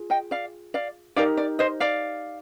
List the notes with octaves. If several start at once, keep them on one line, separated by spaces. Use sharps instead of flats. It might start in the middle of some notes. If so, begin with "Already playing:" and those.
Already playing: F4 G#4
D#5 G5
D5 F5
D5 F5
D#4 G4 A#4 D5 F5
D5
C5 D#5
D5 F5